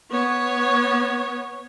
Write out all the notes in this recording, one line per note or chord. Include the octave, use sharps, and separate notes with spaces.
B3 C#5